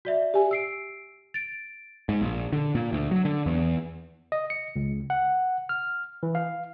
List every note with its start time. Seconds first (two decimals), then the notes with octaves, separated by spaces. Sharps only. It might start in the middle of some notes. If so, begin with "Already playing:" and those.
0.05 F#4 D5 E5
0.34 G4 G#5
0.51 E6 C7 D7
1.34 A6 D7
2.09 G#2
2.22 A#1
2.52 D3
2.75 A#2
2.92 D2
3.11 F#3
3.25 D3
3.46 E2
4.32 D#5
4.50 C#7
4.76 C#2
5.10 F#5
5.69 F6
6.23 E3
6.35 F5